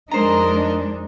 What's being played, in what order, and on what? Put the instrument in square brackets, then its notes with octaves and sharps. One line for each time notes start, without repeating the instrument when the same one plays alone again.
[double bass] F2 D#4 [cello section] G#3 D4 [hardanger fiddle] A#4 D#5 [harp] C5 A#5